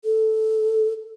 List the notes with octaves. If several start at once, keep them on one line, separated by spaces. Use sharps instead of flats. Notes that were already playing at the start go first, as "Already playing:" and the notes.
A4